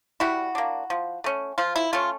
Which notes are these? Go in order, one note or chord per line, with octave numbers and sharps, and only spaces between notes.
G3 E4 F#4
A#3 D4
F3
A3 C#4
F3 F4
E4
A3 C#4 F4